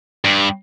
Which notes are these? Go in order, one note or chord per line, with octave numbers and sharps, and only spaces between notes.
G2